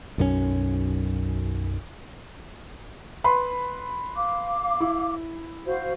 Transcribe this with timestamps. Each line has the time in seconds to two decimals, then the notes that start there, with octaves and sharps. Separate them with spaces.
0.18 B1 F#2 D#3 C#4
3.24 B4 B5 C6
4.17 F5 D6
4.80 E4
5.65 F#4 C5 F5